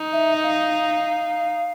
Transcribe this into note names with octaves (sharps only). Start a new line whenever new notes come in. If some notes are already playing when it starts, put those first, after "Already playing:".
Already playing: D#4
E5
F5